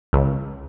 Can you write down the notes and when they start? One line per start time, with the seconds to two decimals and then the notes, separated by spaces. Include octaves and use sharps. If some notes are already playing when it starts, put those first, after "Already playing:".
0.13 C#2